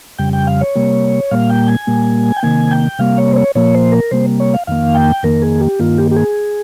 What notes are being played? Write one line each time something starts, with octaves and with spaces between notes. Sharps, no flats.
F2 C#3 G3 G5
G5
F5
C#5
C3 G3 A#3
A#2 G3 A#3 F5
G5
G#5
A#2 G3 A#3
G5
C3 D#3 A#3 G#5
G5
C3 G3 A#3 F5
C#5
C5
C#5
A#2 F3 A#3 C#5
C5
A#4
C3 G3 A#3 C5
C#5
F5
F2 D#3 A#3 F5
G5
F2 D#3 A#3 A#4
G#4
G4
G2 D#3 A#3 F4
G4
G4
G#4